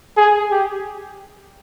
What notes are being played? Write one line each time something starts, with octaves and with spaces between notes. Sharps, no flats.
G#4
G4